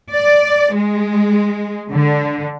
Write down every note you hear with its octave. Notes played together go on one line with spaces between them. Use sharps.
D5
G#3
D3